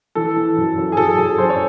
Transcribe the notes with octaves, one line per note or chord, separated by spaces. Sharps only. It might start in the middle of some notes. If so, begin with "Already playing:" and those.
E3 A4
E3
F#2
F#2
G#4
F#2 A4
F#2 G#4
F#2 C5
C#5